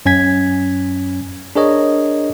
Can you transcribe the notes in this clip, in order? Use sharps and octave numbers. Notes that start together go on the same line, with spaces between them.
F#2 C#4 G#5 G#6 B6
D4 G#4 A#4 C#5 D#5